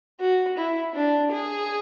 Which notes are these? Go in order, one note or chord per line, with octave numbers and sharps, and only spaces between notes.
F#4
E4
D4
G#4